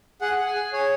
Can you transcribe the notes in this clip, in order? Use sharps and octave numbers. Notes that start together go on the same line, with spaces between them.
G#4 F#5
G#4
G#5
G#4
G#4 C#5